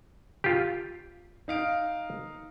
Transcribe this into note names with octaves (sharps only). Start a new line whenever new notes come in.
F4 G4
D#4 F5 D7